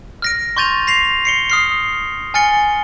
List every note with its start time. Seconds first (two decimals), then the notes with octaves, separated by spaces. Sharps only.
0.22 F6 A#6 D7
0.57 C6 C#6 G6 A6 D#7 F7
0.87 A#6 C7 F7
1.25 C7 C#7 G7
1.50 D#6 F6 C7
2.34 G#5 F6 A6 C#7 G7